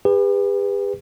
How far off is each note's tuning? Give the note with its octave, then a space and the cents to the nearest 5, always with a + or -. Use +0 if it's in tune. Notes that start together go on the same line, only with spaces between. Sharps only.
G4 +45 B4 +0